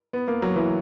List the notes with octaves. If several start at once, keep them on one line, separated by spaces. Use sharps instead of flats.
B3
A#3
F#3
E3